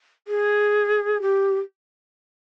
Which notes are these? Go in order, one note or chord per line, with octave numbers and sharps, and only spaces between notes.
G#4
G4